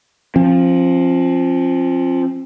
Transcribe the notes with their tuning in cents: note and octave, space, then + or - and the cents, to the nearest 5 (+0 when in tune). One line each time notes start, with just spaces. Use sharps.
F3 +0 C4 +45